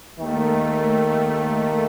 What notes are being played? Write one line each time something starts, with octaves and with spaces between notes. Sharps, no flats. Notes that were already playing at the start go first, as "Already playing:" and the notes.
D#2 D#3 A3 A#3